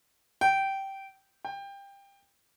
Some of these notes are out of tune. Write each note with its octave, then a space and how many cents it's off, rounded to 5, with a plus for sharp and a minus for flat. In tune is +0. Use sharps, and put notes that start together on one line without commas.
G5 -15
G5 +20